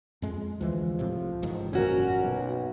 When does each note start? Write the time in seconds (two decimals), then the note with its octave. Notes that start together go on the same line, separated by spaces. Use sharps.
0.22 F2 G#3
0.61 D2 E3 F3 G#3
0.99 C2 A2 C3
1.43 A1 G#2 D#3
1.73 G1 F2 A#2 C#4 F#4 A#4
2.19 B1